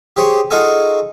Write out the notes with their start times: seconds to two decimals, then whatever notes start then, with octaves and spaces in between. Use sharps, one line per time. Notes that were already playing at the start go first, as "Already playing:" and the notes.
0.16 G4 G#4 C5 C#5
0.50 D#4 F4 F#4 G#4 A4 G#5